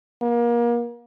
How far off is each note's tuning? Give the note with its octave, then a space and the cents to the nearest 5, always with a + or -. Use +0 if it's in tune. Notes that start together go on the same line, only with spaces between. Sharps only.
A#3 +30